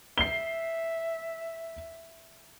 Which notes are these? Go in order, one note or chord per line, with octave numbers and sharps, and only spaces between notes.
E5 C7 G7